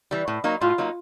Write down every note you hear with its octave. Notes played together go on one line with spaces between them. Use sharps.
E3 G3
A2
F#3 A#3 D#4
A2 F4
F#3 A#3 D#4